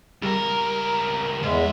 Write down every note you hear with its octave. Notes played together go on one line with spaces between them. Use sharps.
C#2 G3 A#4
E2 G#2 G#3 E5